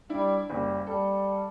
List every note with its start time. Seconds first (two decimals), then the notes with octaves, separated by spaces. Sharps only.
0.09 G3 D4 E4
0.50 F#1 G3
0.87 G3 A4